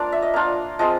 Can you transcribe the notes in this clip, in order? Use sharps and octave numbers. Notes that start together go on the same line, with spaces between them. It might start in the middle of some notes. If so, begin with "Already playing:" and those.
Already playing: A#3 D4 F4 D5
E5
D#5
A#3 D4 F4
F3 G#3 C4 D#5